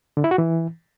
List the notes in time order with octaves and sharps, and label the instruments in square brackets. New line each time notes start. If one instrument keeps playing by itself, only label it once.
[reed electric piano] D3
E4
F#4
E3